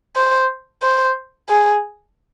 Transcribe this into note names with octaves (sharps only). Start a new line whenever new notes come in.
C5
C5
G#4